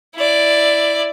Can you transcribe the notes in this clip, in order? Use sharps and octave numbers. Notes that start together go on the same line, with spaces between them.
E4 D5